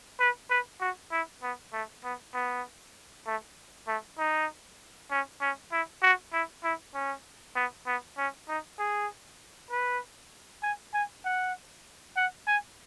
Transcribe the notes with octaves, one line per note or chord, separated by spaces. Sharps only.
B4
B4
F#4
E4
B3
A3
B3
B3
A3
A3
D#4
C#4
C#4
E4
F#4
E4
E4
C#4
B3
B3
C#4
D#4
G#4
B4
G#5
G#5
F#5
F#5
G#5